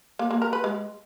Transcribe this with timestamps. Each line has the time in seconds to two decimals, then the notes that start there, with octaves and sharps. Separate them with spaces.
0.19 A#3
0.31 A#3
0.42 A#4
0.53 B4
0.64 G#3